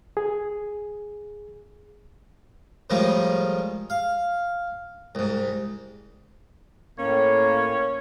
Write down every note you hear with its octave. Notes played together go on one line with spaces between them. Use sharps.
G#4
A2 D#3 F3 G3 G#3
F5
C2 G#2
A2 A#3 C#4 C#5